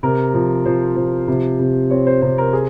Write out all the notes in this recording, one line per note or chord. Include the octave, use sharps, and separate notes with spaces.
C3 A#4
F3
F3 C5
F3
C3
C3
C4 C#5
C5
C3 C5
A#4
G#4